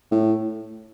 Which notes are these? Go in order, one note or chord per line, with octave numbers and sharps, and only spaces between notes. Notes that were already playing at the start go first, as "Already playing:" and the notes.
A2